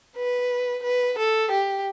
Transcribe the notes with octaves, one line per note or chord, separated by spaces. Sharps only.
B4
B4
A4
G4